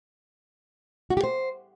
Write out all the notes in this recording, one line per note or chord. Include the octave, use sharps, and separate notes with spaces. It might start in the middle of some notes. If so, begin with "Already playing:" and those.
F#4
G4
C5